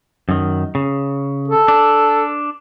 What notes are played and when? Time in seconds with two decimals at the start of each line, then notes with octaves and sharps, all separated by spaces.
0.29 F#2 D#3
0.75 C#3
1.48 A4
1.68 D4